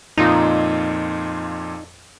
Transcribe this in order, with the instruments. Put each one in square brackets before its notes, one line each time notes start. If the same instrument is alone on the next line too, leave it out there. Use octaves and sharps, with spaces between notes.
[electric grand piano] F2 A#2 F4 [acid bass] D#4